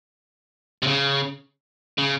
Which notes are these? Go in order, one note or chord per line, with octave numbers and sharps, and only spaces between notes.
C3
C#3
C#3